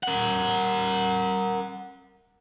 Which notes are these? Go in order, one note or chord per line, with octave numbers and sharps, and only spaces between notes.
A#4 F#5